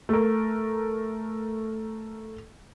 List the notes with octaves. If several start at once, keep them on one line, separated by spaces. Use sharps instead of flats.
A3 A#4